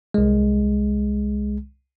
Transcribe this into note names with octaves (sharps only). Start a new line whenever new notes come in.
C2 G#3